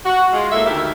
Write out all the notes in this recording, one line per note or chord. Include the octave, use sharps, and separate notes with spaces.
F#4
G#3 F4
A2 A#3 A4 E5
D2 D#3 E4 G4 A#4 E5